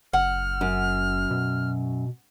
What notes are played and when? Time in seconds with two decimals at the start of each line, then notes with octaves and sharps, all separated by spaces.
0.13 F#1 F#5 F6
0.61 F#2
1.31 B2